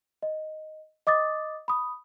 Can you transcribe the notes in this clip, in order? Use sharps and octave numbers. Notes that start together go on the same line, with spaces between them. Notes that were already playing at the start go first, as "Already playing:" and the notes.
D#5
D#5 D6 D#6 A6
B5 D#6